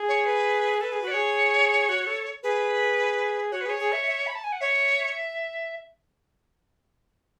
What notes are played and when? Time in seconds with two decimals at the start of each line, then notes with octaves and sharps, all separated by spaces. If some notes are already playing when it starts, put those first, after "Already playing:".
Already playing: G#4
0.08 C#5
0.26 B4
0.81 A4 B4
0.92 G#4
1.02 F#4
1.07 D5
1.11 G#4 C#5
1.89 F#4
2.07 A4
2.43 G#4 B4
3.52 F#4 C#5
3.61 B4
3.66 G#4 C#5
3.79 G#4
3.93 E5
4.07 E5
4.27 B5
4.35 A5
4.44 G#5
4.52 F#5
4.61 C#5 E5